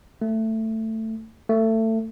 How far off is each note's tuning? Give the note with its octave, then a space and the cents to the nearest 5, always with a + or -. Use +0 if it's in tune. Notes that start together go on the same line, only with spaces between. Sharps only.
A3 +15
A3 +25